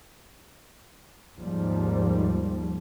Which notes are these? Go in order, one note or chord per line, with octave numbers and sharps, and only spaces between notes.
D#2 G#2 F3 G3